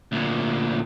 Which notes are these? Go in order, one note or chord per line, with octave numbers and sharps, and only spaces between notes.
D2 A#2